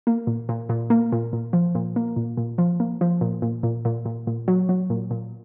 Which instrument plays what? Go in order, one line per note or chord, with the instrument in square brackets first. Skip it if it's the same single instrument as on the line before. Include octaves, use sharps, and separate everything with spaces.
[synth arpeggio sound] A#3
A#2
A#2
A#2
A#3
A#2
A#2
F3
A#2
A#3
A#2
A#2
F3
A#3
F3
A#2
A#2
A#2
A#2
A#2
A#2
F#3
F#3
A#2
A#2